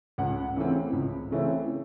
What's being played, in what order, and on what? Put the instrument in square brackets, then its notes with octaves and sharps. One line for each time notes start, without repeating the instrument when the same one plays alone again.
[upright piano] C#2 F#5
C#3 E3 A3 C4
C#2
C#3 E3 A3 C4